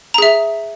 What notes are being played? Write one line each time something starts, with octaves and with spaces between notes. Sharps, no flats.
G#4 E5 A#5